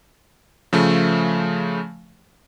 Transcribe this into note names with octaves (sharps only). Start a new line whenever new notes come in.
C#3 F3 A3